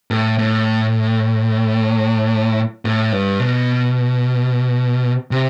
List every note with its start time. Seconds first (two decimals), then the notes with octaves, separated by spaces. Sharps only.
0.11 A2
0.38 A2
2.85 A2
3.12 G2
3.40 B2
5.31 C3